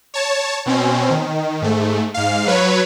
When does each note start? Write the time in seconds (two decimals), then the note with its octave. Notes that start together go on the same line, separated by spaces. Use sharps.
0.14 C#5 A5
0.66 B2 C4 C#4
1.10 D#3
1.62 G#2 A3
2.14 G#2 F5
2.46 F#3 B4 C#5